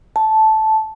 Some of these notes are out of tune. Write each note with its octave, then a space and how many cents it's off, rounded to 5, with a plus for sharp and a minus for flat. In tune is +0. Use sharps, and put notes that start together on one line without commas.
A5 -10